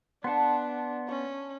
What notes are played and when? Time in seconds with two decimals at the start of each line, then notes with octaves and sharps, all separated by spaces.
0.24 B3 D4 F#5 A5 C6
1.09 C#4 C#6